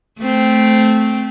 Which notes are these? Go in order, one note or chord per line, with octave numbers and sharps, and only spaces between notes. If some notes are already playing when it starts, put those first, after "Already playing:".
A3 C4